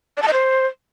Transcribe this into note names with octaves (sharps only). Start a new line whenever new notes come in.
D5
A5
D#5
C5